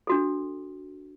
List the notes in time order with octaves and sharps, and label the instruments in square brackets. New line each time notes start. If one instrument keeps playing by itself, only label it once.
[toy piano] D4 F#4 A4